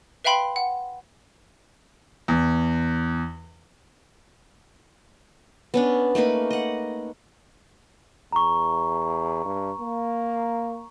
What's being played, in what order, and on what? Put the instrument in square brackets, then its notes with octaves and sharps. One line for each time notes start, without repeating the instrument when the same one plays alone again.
[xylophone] B4 E5 F5 G5 B5 C6
F#5
[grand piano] E2
[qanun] B3 C#4 D4
A3 A#3 D#4 B4
D#5 F#5
[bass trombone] E2 [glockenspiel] A#5 C#6
[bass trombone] G2
A#3